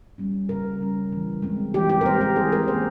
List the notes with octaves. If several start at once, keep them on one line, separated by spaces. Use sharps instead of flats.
G3 C#4
C#3 A#4
G3 C#4
E3
G#3 C4
E3 G4
G4
A#4
G#3 C4 C5
A#4
E3 G#4
A#4
A#3 C#4 C5